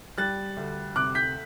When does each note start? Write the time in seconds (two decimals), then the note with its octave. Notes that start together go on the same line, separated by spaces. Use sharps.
0.18 G3 F#6 A6
0.57 D2
0.96 C3 D6 F#6
1.15 G6 B6